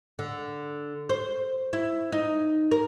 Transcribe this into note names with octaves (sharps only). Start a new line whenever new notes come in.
D3
C5
E4
D#4
A#4